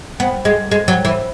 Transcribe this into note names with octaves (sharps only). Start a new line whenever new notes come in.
B3
G#3
G#3
F#3
E3